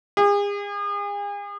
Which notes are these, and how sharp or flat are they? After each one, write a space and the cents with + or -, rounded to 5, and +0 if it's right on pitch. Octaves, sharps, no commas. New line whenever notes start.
G#4 -40